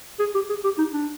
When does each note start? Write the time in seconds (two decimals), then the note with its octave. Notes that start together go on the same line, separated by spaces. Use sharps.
0.20 G#4
0.35 G4
0.49 G#4
0.64 G4
0.78 D#4
0.92 D4